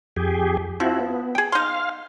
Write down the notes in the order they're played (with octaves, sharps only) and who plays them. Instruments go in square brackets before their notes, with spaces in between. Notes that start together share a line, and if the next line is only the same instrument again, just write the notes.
[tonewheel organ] F2 G4 G#4
[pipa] F3 [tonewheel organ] C4 E4 F#4
[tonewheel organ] B3
[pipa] G#4 G5
[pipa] D#4 C6 [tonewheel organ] F5